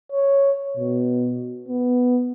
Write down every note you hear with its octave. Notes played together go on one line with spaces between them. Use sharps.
C#5
B2
B3